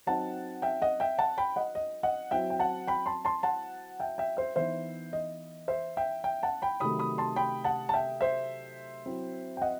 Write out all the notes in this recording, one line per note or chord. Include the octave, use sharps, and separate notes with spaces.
F#3 C4 D#4 F#5 A5
E5 G5
D#5 F#5
E5 G5
F#5 A5
G5 B5
D#5 F#5
D#5
D#5 F#5
F#3 C4 E4 E5 G5
G5
F#5 A5
G5 B5
A5 C6
A5 C6
F#5 A5
E5 G5
E5 G5
C5 E5
E3 B3 D#4 C5 E5
D#5
C5 E5
E5 G5
E5 G5
F#5 A5
G5 B5
C3 D#3 F#3 A3 B5 D#6
B5 D#6
A5 C6
G5 B5
F#5 A5
A5
E5 G5
C5 E5
F#3 C4 E4
G5
D#5 F#5